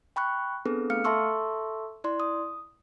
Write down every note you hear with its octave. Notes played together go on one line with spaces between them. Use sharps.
G5 B5 C#6 F#6
B3 C4 D4 G#4 A4 B4
A3 F5 F6 C#7
A4 E5 A5 C6 C#6 E6
E4 D5 C6
D#6